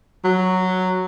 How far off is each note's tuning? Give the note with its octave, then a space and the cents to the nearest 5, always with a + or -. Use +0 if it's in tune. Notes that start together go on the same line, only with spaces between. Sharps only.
F#3 +0